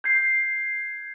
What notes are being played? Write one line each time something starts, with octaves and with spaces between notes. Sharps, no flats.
G6 G#6 C7